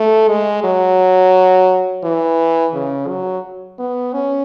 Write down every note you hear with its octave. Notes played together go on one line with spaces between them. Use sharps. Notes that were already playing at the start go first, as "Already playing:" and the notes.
Already playing: A3
G#3
F#3
E3
C#3
F#3
B3
C#4